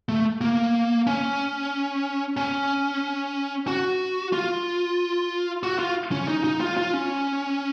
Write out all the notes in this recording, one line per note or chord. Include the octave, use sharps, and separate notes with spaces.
A3
A#3
C#4
C#4
F#4
F4
F#4
F4
C#4
D#4
D#4
F4
F4
C#4